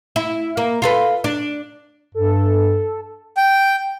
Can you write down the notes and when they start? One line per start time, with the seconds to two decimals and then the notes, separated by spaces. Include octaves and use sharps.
0.16 E4
0.57 A#3
0.82 F4 A4 B4
1.24 D4
2.15 G2 A4
3.37 G5